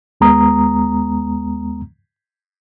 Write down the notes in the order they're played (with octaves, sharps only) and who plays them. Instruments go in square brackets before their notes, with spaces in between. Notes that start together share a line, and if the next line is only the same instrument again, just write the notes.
[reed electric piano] D#2 G#3 B3 A#5 D#6